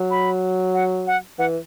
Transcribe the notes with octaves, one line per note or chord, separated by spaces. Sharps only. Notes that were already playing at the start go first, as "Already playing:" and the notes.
Already playing: F#3
B5
F#5
F#5
E3 F#5